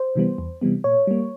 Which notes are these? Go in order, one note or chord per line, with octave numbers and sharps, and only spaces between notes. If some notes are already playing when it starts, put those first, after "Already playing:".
Already playing: C5
C3 E3 G3 B3
E2
C3 E3 G3 B3
A#2 C#5
G3 A#3